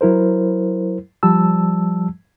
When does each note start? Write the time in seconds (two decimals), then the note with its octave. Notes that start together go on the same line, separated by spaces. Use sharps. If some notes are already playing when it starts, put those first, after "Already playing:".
0.01 F#3 E4 A#4 C5
1.23 F3 G3 A5 E6